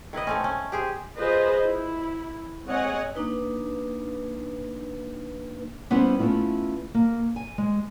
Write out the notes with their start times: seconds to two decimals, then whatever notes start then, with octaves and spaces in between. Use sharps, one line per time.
0.13 D#3 E4 B4 D#5
0.27 A3 C4 C#4
0.44 C#4
0.72 G4 G#4 C5
1.16 F4 G#4 B4 C5 D#5
1.63 E4
2.66 G#3 C4 C#5 D#5 F#5 G#5
3.15 A#3 D4 D#4 B4
5.90 G3 B3 C#4 E4 B4 C5
6.19 A3 B3 C#4 E4 F4
6.94 A#3
7.36 G#5
7.58 G#3